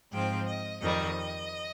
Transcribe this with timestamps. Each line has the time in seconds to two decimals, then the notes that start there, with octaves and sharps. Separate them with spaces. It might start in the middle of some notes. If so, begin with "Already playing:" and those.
0.12 G#2 F3 C4 G5
0.46 D#5
0.80 F2 D#3 G3 D#5